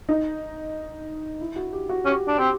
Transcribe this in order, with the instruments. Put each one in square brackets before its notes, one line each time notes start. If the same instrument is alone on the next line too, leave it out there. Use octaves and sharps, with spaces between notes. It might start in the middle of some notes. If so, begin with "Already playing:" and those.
[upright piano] D#4
E4
F#4
G4
F#4
[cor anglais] C#4 [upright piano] G4
[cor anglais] D4
[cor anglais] C4 [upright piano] G4